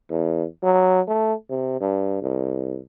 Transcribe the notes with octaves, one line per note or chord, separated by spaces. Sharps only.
E2
F#3
A3
C3
G2
C2